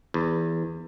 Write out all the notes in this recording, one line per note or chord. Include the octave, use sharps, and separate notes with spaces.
E2